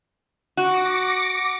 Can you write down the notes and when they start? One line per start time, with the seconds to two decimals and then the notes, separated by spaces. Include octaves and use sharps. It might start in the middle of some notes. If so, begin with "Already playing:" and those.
0.57 F#4 D6 A#6 C#7